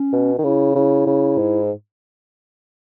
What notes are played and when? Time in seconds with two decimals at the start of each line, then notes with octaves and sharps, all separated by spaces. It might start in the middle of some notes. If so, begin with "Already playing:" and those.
Already playing: C#4
0.13 B2
0.38 D#3
0.44 C#3 E4
0.75 C#3 E4
1.07 C#3
1.38 G#2